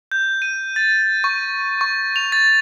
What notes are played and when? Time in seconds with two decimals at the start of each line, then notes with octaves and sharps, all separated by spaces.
0.11 G6
0.42 D#7
0.76 A6
1.24 C#6
1.81 C#6
2.16 F7
2.32 A6